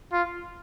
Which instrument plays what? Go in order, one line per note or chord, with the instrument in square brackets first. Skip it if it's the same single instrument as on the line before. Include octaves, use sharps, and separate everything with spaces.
[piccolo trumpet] F4